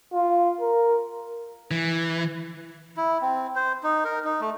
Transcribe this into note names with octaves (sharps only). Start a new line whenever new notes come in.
F4
A#4
E3
E4
C4
C5
D#4
A#4
D#4
A3